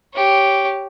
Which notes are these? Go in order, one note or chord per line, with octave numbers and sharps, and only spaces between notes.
G4 C#5